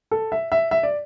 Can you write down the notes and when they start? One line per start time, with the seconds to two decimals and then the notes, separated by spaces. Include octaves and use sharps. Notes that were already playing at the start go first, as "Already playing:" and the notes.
0.11 A4
0.32 E5
0.52 E5
0.71 E5
0.83 D5